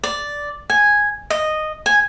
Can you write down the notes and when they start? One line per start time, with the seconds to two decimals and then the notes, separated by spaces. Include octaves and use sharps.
0.04 D5
0.70 G#5
1.30 D#5
1.86 G#5